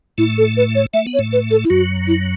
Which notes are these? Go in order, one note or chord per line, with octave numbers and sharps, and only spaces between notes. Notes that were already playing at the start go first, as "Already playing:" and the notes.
A2 A3 E4
A4
B4
C#5
A3 E5
B3
C#5
A2 A3
B4
A4
E4
F#2 F#3 F#4
E4